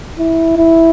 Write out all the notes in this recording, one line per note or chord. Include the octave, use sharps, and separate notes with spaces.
E4
E4